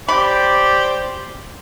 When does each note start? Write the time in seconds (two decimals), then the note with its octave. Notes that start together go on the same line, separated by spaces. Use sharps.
0.08 G4 C5 D5 B5